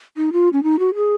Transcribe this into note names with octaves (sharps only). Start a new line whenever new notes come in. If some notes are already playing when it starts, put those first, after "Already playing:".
D#4
F4
C#4
D#4
F#4
G#4